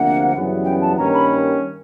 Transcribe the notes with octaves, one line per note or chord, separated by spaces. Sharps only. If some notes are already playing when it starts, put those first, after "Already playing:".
Already playing: D2 C3 F3 A#3 D4 F#5
F#2 C#3 E3 G3 B3
G5
A5
G2 D#3 G3 A#3 C#4 A#5
B5